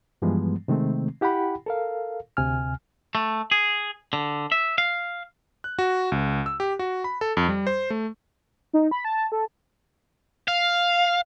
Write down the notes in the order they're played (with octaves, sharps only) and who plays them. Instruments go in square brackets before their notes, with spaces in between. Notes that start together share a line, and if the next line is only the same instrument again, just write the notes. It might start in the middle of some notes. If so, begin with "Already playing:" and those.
[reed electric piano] G2 E3 F3 G3 G#3 B3
C3 D#3 G#3 A3 C4
E4 G4 F#5 G5 B5
A4 A#4 F5
D2 C3 G#5 F6
[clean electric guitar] A3
G#4
D3
E5
F5
[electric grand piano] F#6
F#4
C#2
E6
G4
F#4
B5
A4
F2
G3
C5
A3
[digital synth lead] D#4
B5
A5
A5
A4
[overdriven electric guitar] F5